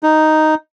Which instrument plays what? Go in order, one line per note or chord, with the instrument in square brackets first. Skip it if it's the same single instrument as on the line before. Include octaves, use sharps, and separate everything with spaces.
[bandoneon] D#4